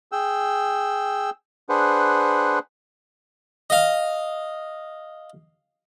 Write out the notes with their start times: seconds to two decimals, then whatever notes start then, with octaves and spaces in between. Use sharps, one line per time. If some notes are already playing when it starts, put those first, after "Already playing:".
0.12 G#4 G5 E6
1.69 D4 G#4 B4 C5 F#5
3.70 D#5 F5